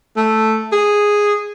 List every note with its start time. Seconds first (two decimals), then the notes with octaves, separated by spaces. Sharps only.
0.17 A3
0.72 G#4